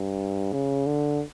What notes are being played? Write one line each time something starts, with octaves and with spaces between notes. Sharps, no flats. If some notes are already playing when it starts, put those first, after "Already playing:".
Already playing: G2
C#3
D3